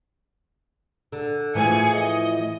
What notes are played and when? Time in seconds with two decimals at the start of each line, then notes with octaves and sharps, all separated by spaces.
1.12 D3
1.55 A2 E3 F3 G#4 G#5 C#7
1.95 D#5